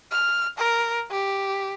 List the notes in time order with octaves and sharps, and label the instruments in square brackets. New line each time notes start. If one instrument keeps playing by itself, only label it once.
[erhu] F6
A#4
G4